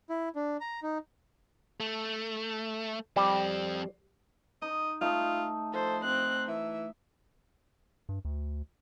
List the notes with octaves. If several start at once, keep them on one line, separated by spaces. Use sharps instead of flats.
E4
D4
A#5
D#4
A3
F2 G3 C4
D#4 D#5
A3 D#4 F4 D#5
F3 A4 C5
C4 F#6
E3 E5
G2
D2